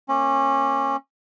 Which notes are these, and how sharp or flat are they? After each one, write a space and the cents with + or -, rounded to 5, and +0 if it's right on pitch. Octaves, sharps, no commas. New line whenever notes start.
A#3 +0 C#4 -25